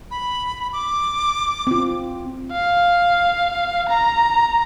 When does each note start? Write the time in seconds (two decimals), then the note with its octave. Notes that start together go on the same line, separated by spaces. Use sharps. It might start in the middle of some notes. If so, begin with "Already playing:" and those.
0.11 B5
0.73 D6
1.67 C4 F4
2.52 F5
3.90 A#5